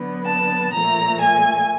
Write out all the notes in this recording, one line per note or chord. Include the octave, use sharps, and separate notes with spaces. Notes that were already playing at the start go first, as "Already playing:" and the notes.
Already playing: D3 F#3 B3
A5
A#2 F3 A3 A#5
G#5